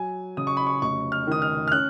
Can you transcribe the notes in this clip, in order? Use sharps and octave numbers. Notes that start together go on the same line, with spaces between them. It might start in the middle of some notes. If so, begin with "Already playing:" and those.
Already playing: F#3 G#5
C#3 D#6
C#6
B5
C#6
F1 C#6
F6
D#3 D#6
F6
F6
C#4 F#6